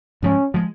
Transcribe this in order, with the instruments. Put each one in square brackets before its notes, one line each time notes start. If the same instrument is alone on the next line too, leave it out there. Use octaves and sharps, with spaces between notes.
[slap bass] G#2 F3 G#3 [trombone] C#4
[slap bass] F3 G#3